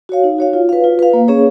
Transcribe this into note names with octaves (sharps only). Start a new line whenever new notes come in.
F#4 C#5 F5
D#4
F#4 C#5 F5
F4
B4 F5
F4
B4 F5
A#3
C#4 G#4 C#5